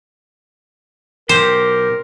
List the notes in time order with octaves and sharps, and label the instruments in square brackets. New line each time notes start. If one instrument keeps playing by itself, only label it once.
[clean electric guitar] B1 G4 [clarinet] A#4 [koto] C5